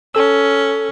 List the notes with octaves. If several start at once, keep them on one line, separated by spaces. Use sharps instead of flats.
C#4 A4 E6